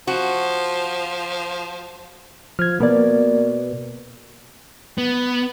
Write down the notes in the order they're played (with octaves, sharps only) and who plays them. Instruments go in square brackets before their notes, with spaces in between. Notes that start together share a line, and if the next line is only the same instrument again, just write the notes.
[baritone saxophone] F3 [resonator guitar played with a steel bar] F#4
[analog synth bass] F3 [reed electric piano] F6 G#6
[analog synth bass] B2 [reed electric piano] A#3 A#4 D5
[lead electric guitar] B3